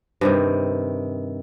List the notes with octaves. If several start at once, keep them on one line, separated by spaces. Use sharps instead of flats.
G2 C3 D#3